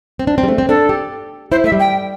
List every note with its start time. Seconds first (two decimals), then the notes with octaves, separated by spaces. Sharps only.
0.19 C4
0.27 D4
0.38 C4
0.43 G3
0.48 A3
0.58 C4
0.69 D4 A4
0.89 G4
1.51 E4 C5
1.64 A3 E5
1.72 G3
1.80 G5